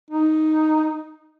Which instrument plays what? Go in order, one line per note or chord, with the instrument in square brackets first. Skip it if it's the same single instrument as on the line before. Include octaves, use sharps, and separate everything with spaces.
[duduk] D#4